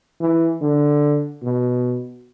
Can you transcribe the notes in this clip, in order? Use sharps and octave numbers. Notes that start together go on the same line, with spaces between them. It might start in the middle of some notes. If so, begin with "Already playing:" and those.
E3
D3
B2